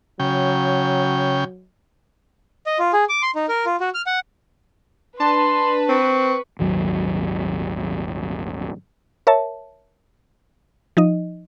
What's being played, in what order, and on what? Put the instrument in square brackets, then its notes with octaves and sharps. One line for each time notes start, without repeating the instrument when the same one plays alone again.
[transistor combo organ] C#3 G5 [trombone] F#3
[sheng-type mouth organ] D#5
F4
G#4
D6
C6
D#4
A#4
F4
F#4
F6
F#5
[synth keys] D4 A5 [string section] B4 [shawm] C6
[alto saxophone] C4 [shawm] C#6
[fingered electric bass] D#1 G#1 D#2 F#3
[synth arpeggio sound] A#4 C#5 E5 A5
F3 D#4 D#5